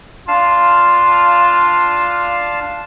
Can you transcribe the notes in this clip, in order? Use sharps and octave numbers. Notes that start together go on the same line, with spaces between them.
D4 F4 F5 A5